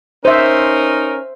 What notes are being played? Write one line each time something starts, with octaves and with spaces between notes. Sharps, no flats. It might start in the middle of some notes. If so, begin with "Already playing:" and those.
C#4 D#4 A#4 C5 E5